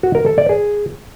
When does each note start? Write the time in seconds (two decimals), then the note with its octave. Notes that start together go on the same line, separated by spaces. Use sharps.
0.03 F#4
0.15 A#4
0.26 A4
0.38 D5
0.49 G#4